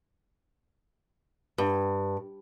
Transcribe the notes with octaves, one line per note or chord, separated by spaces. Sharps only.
G2